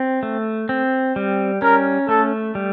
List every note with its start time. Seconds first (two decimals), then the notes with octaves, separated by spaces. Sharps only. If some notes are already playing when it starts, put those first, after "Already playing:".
Already playing: C4
0.23 A3
0.69 C4
1.16 G3
1.62 C#4 A#4
2.09 A3 A4
2.55 G3